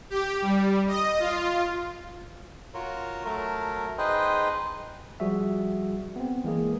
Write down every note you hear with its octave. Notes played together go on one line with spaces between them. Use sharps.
G4
G3
D#5
F4
F4 F#4 A#4 C#5
F#3 A3 A#4
D#4 G#4 B4 C5 D#5 G5
F3 G3 F#4 G#4 E5
B3 C4
E3 G#3 A#3 G#4